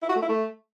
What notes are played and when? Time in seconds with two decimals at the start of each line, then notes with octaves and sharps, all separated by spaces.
0.03 E4
0.09 F#4
0.16 A3
0.22 E4
0.29 A3